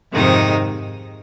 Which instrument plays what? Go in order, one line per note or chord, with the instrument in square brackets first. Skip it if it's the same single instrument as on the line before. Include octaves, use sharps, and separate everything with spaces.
[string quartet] F2 C3 D#3 G#3 D#4 [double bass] G#2